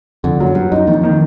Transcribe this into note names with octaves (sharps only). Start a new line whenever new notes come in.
F2 D3
F#2 F#3
G2 F#3
F#2 D#4
F2 D#3
D#3